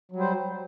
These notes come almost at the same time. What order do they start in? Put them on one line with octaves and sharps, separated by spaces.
F#3 G3 C5